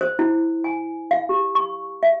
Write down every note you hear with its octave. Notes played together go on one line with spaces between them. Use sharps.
C5
E4
G#5
F5
G4
C#6
E5